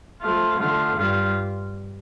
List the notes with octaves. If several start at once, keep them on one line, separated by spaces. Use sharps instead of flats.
F3 A3 F4
D3 A3 F4
G2 G3 F4